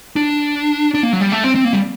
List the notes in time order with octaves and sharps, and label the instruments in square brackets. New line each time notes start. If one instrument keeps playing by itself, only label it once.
[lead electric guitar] D4
D4
A#3
F#3
G3
A3
C4
C4
A#3
G3